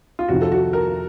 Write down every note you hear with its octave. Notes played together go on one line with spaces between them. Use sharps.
F4
F2 C3 D#3 F#4
A4
F#4
A#4